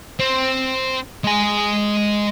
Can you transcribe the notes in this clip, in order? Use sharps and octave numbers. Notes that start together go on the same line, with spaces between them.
C4
G#3 G#5